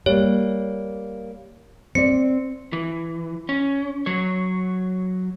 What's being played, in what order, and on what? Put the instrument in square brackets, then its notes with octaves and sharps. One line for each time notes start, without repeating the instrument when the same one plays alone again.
[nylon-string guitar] G3 A#3 [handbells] C#5
[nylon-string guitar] C4 D5 [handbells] C#7
[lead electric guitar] E3
C#4
F#3 C#5